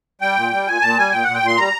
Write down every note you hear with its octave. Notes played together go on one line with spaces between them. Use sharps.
G3 G5
A#2
G3
A#2 G#5
A#2 A5
G3 G#5
A#2 G5
A#2 F#5
G5
A#2 C6
G3 A#5